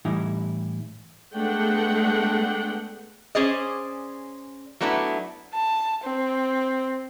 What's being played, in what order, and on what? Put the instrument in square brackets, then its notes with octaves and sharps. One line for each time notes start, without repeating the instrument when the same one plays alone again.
[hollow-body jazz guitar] A2 E3 G3 D#4 E4
[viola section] G#3 A3 B3 D4 F#5 G5
[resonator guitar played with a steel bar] C#4 G#4 C5 D5 D#5
F#3 A3 B3 D4 E4
[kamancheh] A5
C4